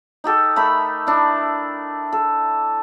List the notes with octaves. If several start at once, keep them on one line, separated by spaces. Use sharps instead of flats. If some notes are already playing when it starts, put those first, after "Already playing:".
D#4 G4 A4 G5
A3 A#4 B5
D4 E4
A4